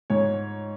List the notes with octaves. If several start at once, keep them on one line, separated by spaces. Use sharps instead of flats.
G#2 C#5